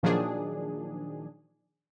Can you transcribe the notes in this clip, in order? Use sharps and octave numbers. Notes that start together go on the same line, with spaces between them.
A#2 D#3 F3 F#3 D4 G#4